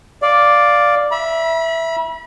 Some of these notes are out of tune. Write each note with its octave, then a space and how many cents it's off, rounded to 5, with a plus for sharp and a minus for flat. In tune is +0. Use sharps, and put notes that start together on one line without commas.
D5 +0 F5 +0
E5 +0 B5 -35